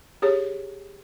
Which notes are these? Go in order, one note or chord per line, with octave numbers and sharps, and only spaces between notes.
G4 G#4 C#5